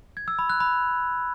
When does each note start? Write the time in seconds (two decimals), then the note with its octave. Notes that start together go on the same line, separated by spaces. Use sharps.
0.17 G#6
0.28 E6
0.39 B5
0.50 F#6
0.60 B5